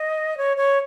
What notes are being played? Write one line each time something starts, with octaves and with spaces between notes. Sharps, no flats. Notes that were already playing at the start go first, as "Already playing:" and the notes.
Already playing: D#5
C#5
C#5